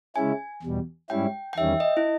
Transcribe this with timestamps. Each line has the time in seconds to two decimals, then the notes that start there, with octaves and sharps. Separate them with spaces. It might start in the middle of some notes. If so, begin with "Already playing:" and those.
0.16 C#3 G#3 C#4 E4 G#5
0.62 E2 B2 G3
1.10 G#2 G3 C#4 E4 G5
1.53 G5
1.57 E2 D#3 G3 C#4 E5
1.80 D#5
1.97 E4